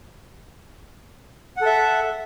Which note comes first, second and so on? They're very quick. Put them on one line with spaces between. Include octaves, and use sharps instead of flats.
F#5 A4 E5